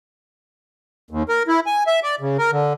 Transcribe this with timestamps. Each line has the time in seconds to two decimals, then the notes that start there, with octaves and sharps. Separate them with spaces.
1.11 D#2
1.29 A#4
1.48 E4
1.66 G#5
1.87 E5
2.03 D5
2.21 C#3
2.38 A#4
2.52 D3